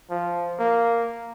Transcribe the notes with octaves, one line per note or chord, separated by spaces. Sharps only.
F3
A#3